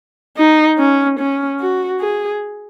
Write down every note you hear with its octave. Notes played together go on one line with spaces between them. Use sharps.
D#4
C#4
C#4
F#4
G#4